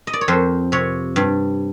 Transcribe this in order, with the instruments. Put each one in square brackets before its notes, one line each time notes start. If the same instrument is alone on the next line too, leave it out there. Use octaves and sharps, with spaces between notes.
[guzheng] D#5
D5
C#5
F2 C5
C3 C#5
G2